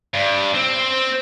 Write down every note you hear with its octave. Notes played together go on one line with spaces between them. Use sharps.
G2
C4